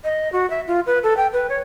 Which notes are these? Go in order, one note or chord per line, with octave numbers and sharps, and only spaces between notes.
D#5
F#4
E5
F4
B4
A4
G5
B4
C#5